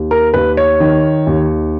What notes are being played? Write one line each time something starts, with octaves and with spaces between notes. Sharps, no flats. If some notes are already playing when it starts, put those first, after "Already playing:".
Already playing: D#2
A#4
D#2 B4
C#5
D#3
D#2